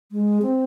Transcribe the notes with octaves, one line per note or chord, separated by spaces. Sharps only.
G#3
C4